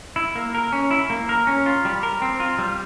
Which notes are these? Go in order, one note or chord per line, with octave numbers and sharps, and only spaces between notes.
E4
A#3
A#4
C#4
E4
A#3
A#4
C#4
F4
G3
A#4
C4
F4
G3